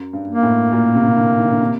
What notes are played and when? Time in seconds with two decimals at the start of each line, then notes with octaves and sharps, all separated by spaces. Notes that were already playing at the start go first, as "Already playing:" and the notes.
Already playing: F#2
0.13 G2
0.28 A#3
0.43 A2
0.72 A#2
0.95 C3
1.06 C3
1.17 D3
1.39 D#3
1.51 D3
1.60 C3